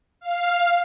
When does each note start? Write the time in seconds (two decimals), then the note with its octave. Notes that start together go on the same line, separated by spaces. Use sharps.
0.21 F5